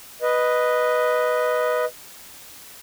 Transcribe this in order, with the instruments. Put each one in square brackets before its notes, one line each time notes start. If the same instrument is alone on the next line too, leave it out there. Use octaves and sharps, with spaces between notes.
[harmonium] B4 D#5